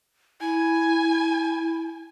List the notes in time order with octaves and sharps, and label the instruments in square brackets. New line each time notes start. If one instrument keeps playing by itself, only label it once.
[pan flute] E4 [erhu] G#5